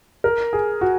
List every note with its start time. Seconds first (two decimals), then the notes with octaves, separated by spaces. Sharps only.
0.24 A#4
0.53 G#4
0.81 F#4